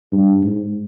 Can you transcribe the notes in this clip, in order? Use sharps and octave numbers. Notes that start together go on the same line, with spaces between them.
G2
G#2